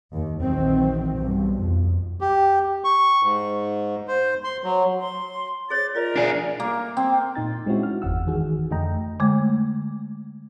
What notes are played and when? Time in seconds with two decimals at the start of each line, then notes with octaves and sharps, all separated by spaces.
0.12 D#2
0.42 A#1 D#3 E3 F#3 C4
1.13 B1 G2
1.55 F2
2.21 G4
2.84 C#6
3.23 G#2
4.08 C5
4.44 C6
4.64 F#3
4.99 C6
5.70 G#4 C5 C#5 A6
5.95 F4 A#4 D5 D#5
6.16 D4 G#4
6.60 A#3
6.97 C4
7.35 A#2 D#4 A6
7.66 G#3 C4 C#4 E4 F#4
7.83 F6
8.02 G1 E2 F#5 E6
8.27 D#3 E3 F#4 G#4
8.71 F2 D3 A3 D#5 G5 A#5
9.20 D3 G#3 A3